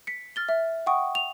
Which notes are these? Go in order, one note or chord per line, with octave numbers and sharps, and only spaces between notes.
B6 C#7
F6 A6 G7
E5
F#5 G5 C#6 D#6
F7